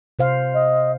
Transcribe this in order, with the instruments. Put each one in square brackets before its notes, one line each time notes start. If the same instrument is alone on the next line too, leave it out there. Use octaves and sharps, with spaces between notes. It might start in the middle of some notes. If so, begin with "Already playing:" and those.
[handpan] C3 C5 F5
[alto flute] D#5